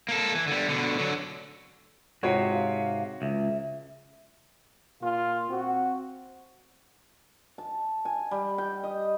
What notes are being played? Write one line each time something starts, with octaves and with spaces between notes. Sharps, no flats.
A#3 A4
E3
D3 G3
B2 D3
D3 F#3
G#2 C3 F4 F#4 C#5
F5
C#2 E5
A#2 F4
C4 F#4
A5
G#5
G3
G5
D#5